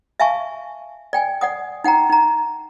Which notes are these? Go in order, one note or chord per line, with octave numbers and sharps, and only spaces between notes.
E5 F5 G#5 A5 C#6
D5 G5 G#5
D5 F#5 D#6
D#4 F#5 G5 A#5
D#4 A#5